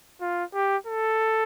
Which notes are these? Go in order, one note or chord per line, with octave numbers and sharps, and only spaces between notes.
F4
G4
A4